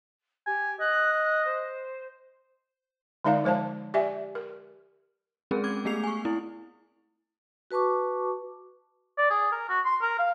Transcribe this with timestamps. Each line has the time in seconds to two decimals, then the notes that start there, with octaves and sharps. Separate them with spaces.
0.46 G4 G#5
0.80 D#5 F#6
1.45 C5
3.24 D3 G#3 D#4 D5 F5
3.44 F3 G#3 C5 F5 A5
3.94 G4 D5 E5 G#5
4.35 A#4
5.51 G#3 C4 C#4 G#4 A#4
5.64 D6 G#6
5.85 A3 B3 G#4 C7 F7
6.04 G#5 C#6
6.25 C4 E4
7.71 F#4 B4 A5 C#6 D6
9.18 D5
9.30 G#4
9.52 A#4
9.69 F#4
9.85 C6
10.02 A#4
10.19 F5